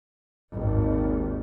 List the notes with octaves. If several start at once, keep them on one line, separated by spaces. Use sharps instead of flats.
G#1 D#2